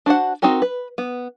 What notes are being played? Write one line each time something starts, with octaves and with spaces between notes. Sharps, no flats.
D4 F#4 C5 F#5
C4 D#4 F#4 G4 A#4
B4
B3